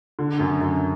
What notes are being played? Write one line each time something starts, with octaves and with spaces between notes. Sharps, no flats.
D3
F#2
F#2